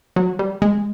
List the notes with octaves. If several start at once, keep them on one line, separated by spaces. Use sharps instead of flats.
F#3
G3
G#3